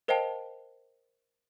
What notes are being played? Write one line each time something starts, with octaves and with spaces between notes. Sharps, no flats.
A#4 C5 D#5 F5 G5 A5